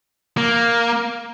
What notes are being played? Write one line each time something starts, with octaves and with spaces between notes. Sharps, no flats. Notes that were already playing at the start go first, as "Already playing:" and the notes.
A#3